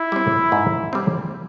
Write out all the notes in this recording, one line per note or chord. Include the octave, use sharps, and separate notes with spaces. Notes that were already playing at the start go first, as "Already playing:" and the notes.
Already playing: E4
G3 C4
G#2
G3 C4